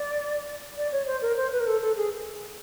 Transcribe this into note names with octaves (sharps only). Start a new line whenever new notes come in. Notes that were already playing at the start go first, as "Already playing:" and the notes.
Already playing: D5
D5
C#5
C5
A#4
C5
B4
A#4
A4
A4
G#4